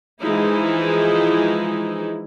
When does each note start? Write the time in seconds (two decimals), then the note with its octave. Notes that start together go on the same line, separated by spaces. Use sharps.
0.20 E3 F3 G#3 D#4 E4